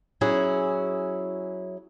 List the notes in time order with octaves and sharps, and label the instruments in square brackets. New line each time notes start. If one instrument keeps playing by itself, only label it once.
[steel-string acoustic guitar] F#3 C#4 E4 G#4